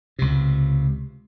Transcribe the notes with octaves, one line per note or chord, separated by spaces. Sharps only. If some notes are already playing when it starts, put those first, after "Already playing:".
C#2 C3